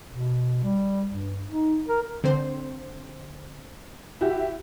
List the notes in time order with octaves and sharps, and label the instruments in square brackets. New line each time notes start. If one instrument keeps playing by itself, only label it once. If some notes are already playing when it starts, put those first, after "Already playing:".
[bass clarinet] B2
G3
G2
D#4
A#4
[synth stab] D3 C4 C5
[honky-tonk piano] E4 F#4 G4